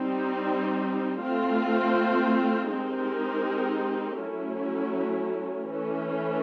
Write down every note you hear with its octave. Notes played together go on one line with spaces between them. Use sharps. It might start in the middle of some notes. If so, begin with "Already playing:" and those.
Already playing: G3 C4 D#4
A3 C4 F4
G#3 C4 D#4 G4 A#4
F#3 A3 C#4 E4
E3 A3 C#4